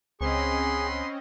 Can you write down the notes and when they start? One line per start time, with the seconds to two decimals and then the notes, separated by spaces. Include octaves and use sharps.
0.21 C#2 C4 C#4 G#4 D#5 F#5 B5 C6